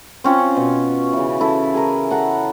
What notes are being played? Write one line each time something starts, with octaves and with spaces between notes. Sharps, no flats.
C4 C#4 F4
B2
C#3 E3
E4 A4
G#4 A#4
A4 F#5 A#5